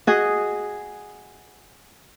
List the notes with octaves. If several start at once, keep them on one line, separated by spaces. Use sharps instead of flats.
F#4 G#4 D#5